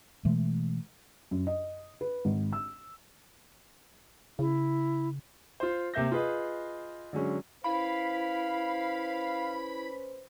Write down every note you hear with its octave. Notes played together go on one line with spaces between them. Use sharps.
B2 E3 G#3 A3
F#2
D#5
B4
G#1
E6
C#3 E4
F4 C5
C3 A#3 E5 G6 A#6
F4 G#4 B4 D#5
D3 F#3 G#3 C#4
C#4 E4 B4 C5 F5 B5